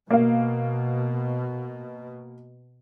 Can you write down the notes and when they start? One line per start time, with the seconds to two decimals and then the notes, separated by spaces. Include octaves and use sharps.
0.11 B2 A#3 F5